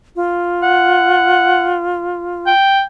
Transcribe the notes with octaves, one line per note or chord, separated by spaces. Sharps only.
F4
F#5
G5